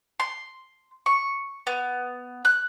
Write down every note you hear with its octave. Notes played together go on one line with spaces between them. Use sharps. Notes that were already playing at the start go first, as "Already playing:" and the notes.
C6
C#6
B3
F#6